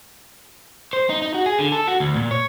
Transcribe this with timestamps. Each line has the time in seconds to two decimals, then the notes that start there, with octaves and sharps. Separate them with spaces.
0.93 C5
1.09 D#4
1.22 D#4
1.34 F#4
1.46 G#4
1.59 D3
1.72 A4
1.87 F#4
2.00 D2
2.16 A#2
2.31 C#5